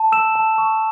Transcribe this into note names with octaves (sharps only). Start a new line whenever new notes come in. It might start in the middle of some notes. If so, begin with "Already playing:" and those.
Already playing: A5
E6 E7
A5
C#6